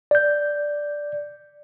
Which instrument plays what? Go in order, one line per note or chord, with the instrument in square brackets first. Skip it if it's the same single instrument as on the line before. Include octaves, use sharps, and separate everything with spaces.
[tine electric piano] D5 G6